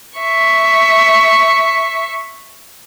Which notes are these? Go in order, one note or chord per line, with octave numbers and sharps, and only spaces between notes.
E5 C#6